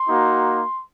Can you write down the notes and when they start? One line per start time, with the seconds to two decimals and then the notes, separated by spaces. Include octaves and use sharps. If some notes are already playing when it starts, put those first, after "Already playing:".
Already playing: C6
0.09 A#3 D#4 F#4